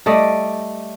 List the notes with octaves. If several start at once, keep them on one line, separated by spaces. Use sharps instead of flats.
G3 A3 D5 D#5